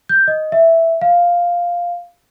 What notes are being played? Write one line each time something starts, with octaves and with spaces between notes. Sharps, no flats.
G6
D#5
E5
F5